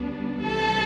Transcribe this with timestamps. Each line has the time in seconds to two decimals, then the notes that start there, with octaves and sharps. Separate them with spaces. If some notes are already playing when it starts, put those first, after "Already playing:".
Already playing: D2 D3 G3 B3 D4
0.41 C2 C3 E3 G3 A4